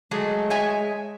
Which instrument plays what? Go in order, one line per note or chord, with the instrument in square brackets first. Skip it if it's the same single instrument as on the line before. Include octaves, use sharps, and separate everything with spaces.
[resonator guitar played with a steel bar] F#3 A3 G#4 [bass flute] G#3
[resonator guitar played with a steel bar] C#5 E5 G#5